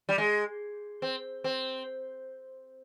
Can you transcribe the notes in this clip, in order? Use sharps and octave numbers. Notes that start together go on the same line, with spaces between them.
G3
G#3
C4
C4